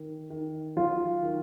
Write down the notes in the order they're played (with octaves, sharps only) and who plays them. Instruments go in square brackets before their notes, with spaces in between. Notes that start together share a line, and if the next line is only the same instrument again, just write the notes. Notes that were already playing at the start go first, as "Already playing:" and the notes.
Already playing: [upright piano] D#3
D#3
[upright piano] F#3 [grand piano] F4
[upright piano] D#3